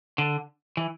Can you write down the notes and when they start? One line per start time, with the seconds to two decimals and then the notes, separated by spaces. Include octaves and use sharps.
0.18 D3
0.77 E3